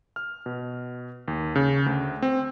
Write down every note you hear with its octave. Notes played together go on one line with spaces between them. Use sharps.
F6
B2
D#2
C#3
D2
C4